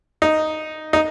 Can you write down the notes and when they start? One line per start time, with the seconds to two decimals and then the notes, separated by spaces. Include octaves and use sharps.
0.22 D#4
0.93 D#4